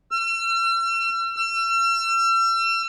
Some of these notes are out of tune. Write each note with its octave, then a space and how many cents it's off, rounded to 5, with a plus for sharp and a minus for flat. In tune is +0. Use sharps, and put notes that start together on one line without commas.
E6 +45
E6 +40